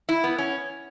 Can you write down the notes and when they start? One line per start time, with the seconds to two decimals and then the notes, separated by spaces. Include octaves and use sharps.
0.09 E4
0.24 B3
0.38 C#4